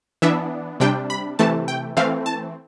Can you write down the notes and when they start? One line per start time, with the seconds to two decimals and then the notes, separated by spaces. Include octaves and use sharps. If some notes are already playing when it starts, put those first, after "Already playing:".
0.22 E3 B3 D4 E5
0.80 C3 G3 D4 G5
1.10 B5
1.39 C3 E3 A3 A5
1.68 G5
1.97 E3 A3 C4 F5
2.26 A5